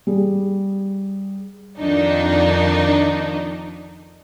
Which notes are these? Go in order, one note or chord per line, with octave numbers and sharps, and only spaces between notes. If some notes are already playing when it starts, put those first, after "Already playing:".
G3 G#4
F2 D#3 D4 D#4